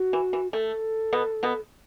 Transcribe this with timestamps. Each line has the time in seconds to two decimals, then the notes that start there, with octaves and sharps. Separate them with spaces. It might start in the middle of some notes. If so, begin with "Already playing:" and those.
Already playing: F#4
0.13 E3
0.33 E3
0.52 A3 A4
1.13 B2 B3
1.43 B2 B3